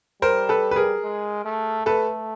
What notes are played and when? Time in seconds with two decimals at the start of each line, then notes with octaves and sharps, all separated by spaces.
0.22 G3 A#4 C5
0.49 A4 B4
0.71 B4
0.76 G#4 A#4
1.04 G#3
1.45 A3
1.86 A3 A4 B4